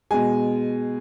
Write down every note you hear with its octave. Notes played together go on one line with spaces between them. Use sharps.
B2 G#3 G#5